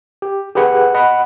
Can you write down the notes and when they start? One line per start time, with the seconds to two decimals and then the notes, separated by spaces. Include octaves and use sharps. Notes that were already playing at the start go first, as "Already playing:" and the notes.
0.22 G4
0.55 G4 G#4 B4 F#5
0.94 D#5 F#5 B5